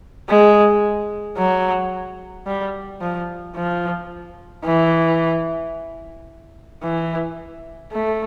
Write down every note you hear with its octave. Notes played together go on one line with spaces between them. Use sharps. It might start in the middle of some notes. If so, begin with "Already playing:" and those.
G#3
F#3
G3
F3
F3
E3
E3
A3